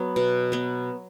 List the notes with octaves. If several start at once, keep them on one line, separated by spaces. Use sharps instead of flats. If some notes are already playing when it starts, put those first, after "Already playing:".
Already playing: F#3 B3
B2
F#3 B3